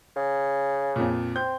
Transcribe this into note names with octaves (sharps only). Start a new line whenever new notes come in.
C#3
F2 A#2
C4 G6